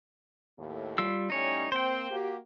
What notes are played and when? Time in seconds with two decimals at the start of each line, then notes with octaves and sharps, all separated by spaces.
0.58 D#2 A2
0.98 G3 F4 E6
1.30 A2 G3 C#4 D#4 C#5
1.72 A#3 C4 C5 G5
2.10 A#3 F#4 G4